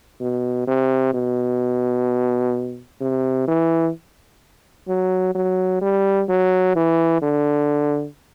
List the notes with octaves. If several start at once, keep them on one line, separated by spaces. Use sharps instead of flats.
B2
C3
B2
C3
E3
F#3
F#3
G3
F#3
E3
D3